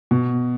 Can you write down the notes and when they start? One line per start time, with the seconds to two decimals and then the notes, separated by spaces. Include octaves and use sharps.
0.11 B2